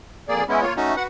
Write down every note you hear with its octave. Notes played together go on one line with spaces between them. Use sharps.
F2 A#3 G#4 D5
G#3 B3 C#4 E4
A#3 F4 C#5
A3 C#4 D#4 F#4
F#4 B4 F#5